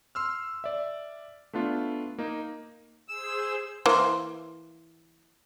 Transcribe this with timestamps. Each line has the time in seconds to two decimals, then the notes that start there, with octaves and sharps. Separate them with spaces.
0.15 C6 E6 F6
0.64 D5 E5
1.53 A3 B3 D4 F4
2.18 A#3 D#4
3.08 G#4 C5 E6
3.86 E3 A#3 C5